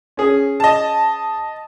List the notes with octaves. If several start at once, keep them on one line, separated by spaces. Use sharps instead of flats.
C#4 G#4
D#5 A5